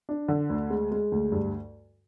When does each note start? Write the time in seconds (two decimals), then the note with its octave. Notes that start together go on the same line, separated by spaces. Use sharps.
0.09 D4
0.28 D3
0.50 D2
0.70 G#3
0.91 G#3
1.12 D2
1.32 G2